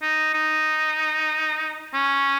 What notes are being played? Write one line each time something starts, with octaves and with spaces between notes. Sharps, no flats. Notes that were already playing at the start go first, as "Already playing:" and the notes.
D#4
D#4
C#4